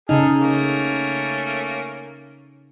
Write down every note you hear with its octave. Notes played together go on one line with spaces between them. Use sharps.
C#3 D#4 G#4 A4 F6
A3 A#3 C#4